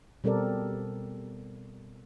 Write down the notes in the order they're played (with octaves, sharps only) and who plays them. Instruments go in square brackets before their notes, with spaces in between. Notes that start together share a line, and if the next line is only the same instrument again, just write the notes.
[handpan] B2 G3 C4 A4 A#4 D5